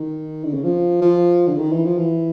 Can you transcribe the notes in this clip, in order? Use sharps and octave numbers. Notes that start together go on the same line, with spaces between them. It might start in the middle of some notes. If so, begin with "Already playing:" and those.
Already playing: D#3
D3
C#3
F3
F3
D3
D#3
E3
F3
E3